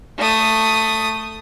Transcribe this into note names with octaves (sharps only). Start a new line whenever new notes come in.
A3 D#6